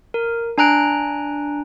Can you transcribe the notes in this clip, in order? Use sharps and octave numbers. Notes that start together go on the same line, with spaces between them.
A#4
D4 G#5 A#5 F#6 D7